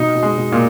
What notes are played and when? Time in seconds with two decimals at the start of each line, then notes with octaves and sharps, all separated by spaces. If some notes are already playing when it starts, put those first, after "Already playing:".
Already playing: B2 D#4
0.15 B2
0.23 G#3
0.38 B2
0.52 A#2